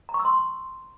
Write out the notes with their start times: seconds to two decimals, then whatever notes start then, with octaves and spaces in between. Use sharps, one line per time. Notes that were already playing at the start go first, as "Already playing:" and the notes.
0.09 A#5
0.14 C#6
0.20 E6
0.25 C6